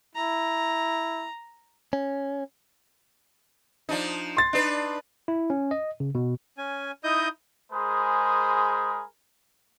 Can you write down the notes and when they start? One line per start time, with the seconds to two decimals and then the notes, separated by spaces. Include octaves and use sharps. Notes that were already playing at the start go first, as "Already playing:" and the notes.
0.16 E4 A#5
1.93 C#4
3.89 F3 D4 D#4
4.37 C6 A6
4.53 D4 D#4 B4
5.28 E4
5.50 C#4
5.71 D#5
6.00 C#3
6.15 B2
6.58 C#4 G#5
7.04 D#4 E4 D#5 D#6 G6
7.72 G#3 G#4 A#4 C5 B5 D#6